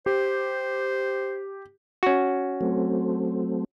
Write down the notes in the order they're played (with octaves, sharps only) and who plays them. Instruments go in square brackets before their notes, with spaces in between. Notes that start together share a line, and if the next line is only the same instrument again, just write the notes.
[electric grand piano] G4 [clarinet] C5
[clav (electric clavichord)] C#4 F#4
[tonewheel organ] F#3 A3 C4